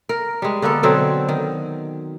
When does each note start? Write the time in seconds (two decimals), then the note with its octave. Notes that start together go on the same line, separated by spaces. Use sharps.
0.09 A#4
0.42 G3 G#3
0.62 D3 A#3 B3 A4
0.83 B2 D3 F#3 C4
1.29 D#3